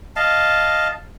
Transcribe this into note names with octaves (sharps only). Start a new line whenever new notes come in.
D#5 F5 A5